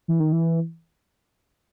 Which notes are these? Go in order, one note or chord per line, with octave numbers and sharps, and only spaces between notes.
E3
D#3
E3